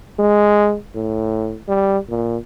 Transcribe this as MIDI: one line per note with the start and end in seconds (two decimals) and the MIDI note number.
0.19 0.76 56
0.95 1.57 45
1.68 1.98 55
2.10 2.37 46